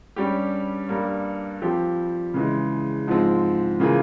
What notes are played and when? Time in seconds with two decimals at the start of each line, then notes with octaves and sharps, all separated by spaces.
0.16 G2 G3 C#4 G4
0.89 G2 G3 A#3
1.62 F3 C4 G4
2.34 C#3 E3 G#3
3.07 G#2 F3 G#3 C4
3.80 C#3 E3 A#3 F4 G#4